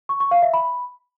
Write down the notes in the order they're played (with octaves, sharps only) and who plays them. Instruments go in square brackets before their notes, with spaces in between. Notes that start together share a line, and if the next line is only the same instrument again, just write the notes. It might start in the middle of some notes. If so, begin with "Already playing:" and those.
[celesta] C#6
C#6
F5
E5
B5